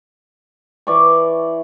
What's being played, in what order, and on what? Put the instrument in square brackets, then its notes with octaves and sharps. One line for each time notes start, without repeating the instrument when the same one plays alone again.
[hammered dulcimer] E3 D5 C#6